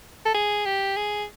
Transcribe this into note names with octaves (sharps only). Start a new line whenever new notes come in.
A4
G#4
G4
G#4